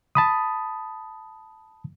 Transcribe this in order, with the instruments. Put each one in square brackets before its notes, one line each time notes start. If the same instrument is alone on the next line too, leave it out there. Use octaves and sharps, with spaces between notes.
[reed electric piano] A5 B5 D#6